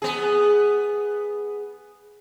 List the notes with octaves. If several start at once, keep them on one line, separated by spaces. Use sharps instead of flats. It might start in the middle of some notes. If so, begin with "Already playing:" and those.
B3 G#4